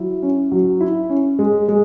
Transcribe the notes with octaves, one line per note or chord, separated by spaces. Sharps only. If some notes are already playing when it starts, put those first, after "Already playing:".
Already playing: F#3 E4
C#4
F#3
E4
C#4
G#3
G#3